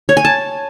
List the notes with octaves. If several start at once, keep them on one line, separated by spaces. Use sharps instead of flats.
C#5
G#5
A5